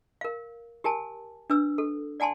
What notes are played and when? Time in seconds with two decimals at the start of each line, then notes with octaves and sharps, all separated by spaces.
0.21 A#4 F5
0.84 G4 A#4 G#5 A5
1.50 D4 B4 E6
1.78 A4
2.20 D5 F#5 G#5 A5 C6